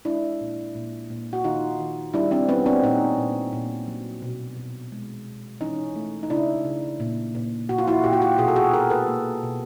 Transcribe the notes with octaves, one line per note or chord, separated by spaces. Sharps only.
G#3 D4 E4
A#2
A#2
A#2
F#4
D#3 D#4 F4
D#3
G3 D4 E4
C4 D4
G3 B3 C#4
C4 D4
A#2 C#4 D#4
A#2
A#2
F#3
B2
B2
G#3
B2
E3 C#4 D#4
A3
D#4
C#3 D4 E4
C#3
A#2
A#2
A#2 F#4
F4
E4 F#4
A#2 G4
F#4
F4 G4
B2 F#4 G#4
A4
F#4 G#4
A#3 G#4 A#4
A4 B4
A#3
B2